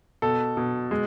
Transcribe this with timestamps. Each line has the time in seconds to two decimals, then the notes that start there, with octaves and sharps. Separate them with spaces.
0.22 B2 A4
0.57 B2
0.91 G#3